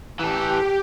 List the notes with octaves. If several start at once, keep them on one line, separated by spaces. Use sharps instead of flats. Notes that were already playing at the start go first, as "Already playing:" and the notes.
E3 G4 A4